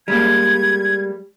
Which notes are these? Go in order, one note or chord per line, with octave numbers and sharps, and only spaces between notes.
G3 G#3 A#3 G#6